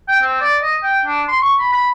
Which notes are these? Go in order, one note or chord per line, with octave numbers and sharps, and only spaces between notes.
G5
C4
D5
D#5
G5
D4
C6
C#6
B5
B5